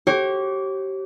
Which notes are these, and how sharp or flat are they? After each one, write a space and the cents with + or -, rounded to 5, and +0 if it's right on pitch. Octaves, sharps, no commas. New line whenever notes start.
G4 -30 C#5 -40